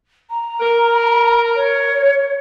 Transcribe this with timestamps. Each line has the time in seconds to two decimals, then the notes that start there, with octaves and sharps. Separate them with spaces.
0.30 A#5
0.61 A#4
1.55 C#5